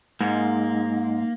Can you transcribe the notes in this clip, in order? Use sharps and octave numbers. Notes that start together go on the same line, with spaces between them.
G#2 A#3